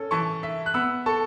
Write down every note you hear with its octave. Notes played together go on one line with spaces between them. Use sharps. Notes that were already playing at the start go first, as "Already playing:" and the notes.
Already playing: C#4 A4
E3 A5 C#6
E5
F#6
B3 B5 E6
A4 A5 C#6